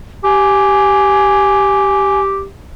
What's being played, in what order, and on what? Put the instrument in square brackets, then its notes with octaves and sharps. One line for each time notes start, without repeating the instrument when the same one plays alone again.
[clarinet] G4 [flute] G#5